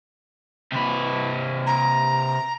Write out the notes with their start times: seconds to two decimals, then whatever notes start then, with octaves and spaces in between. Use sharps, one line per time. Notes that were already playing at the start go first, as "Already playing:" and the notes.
0.72 C3 B4
1.66 A#5